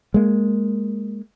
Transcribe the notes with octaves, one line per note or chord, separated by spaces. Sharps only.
G#3 A#3